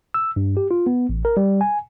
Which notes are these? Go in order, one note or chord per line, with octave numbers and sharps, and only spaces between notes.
E6
G2
G4
F4
B3
A1
A#4
G3
G#5